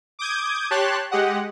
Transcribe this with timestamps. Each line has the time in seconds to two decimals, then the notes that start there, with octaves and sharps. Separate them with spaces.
0.19 D6 D#6 G6 G#6
0.71 G4 C#5 A5 C6 F#6
1.11 G#3 G4 D#5 F#5